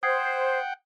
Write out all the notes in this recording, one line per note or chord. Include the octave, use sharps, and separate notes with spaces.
C5 F#5 G5 D#6 G#6 C7